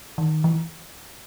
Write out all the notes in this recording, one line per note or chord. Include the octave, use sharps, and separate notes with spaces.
D#3
E3